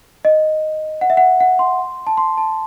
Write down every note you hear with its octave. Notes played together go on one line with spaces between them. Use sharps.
D#5
F#5
E5
F#5
F#5
C6
A5
C6
A5